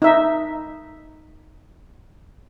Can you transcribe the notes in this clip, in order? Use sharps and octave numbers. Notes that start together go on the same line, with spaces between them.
D#4 E5